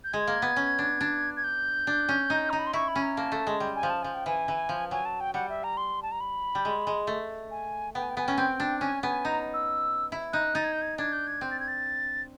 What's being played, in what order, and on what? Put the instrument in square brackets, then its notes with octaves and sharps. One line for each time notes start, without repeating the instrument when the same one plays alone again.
[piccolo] G6
[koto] G#3 [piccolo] G#6
[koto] A#3
B3
C#4
D4
D4
[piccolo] G#6
G6
[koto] D4
C#4
D#4
[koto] D#4 [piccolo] A#5
[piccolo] B5
C6
[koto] E4 [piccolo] C#6
[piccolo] B5
[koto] C#4
[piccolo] A#5
[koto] A#3 [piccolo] A5
[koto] A3
G#3
G3
[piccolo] G#5
[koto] F3
[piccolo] A5
[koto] F3 [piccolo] G#5
[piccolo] G5
[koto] E3 [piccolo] G#5
[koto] E3
F3
[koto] F#3 [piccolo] G#5
[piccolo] A5
G5
[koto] G3 [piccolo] F#5
[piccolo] E5
A#5
C6
A5
A#5
B5
[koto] G3
G#3
G#3
A3
[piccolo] G#5
[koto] B3 [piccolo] G5
[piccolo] G#5
G5
[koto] B3 [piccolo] G#5
[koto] C#4 [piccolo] G5
[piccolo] G#5
[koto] C4 [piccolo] G5
[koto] D4
[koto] C#4 [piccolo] G#5
[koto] B3 [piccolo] G#5
[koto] D#4 [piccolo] A#5
[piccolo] E6
[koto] E4
[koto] D#4 [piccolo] F#6
[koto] D#4 [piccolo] A6
[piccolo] G#6
G6
G#6
[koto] D4 [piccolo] G#6
[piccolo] G6
G#6
[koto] C4
[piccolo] A6
G#6
A6